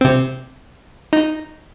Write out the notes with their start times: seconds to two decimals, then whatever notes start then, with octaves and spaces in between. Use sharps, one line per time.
0.01 C3 C4
1.13 D#4